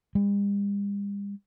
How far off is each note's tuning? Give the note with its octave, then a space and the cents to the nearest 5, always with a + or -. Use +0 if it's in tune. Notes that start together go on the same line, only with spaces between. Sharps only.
G3 +45